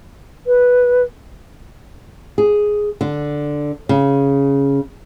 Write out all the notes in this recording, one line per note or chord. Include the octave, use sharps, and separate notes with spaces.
B4
G#4
D3
C#3